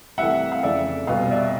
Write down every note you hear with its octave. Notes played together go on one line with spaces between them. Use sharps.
C2 C3 E3 A3 E5 F#5
F5
F2 C#3 E3 A3 D5 E5
C2 B2 G3 B3 D#5 F5
D5 E5